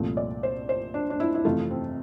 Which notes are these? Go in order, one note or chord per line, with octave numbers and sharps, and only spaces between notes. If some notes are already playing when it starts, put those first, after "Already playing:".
Already playing: C2 A#2 F3 A3
D5
C5
C5
D4
D4
E4
E4
F2 C3 E3 A3 F4
C4